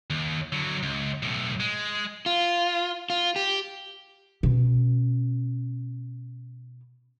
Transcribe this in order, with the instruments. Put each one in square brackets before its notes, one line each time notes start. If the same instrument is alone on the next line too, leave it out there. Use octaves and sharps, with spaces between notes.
[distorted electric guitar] D#2
D3 F#3
C#2
B1 A2
G#3
[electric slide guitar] F4
F4
G4
[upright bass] B2 C#4